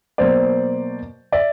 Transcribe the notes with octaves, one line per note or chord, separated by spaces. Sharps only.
B2 F#3 A#3 C5 D5
D5 E5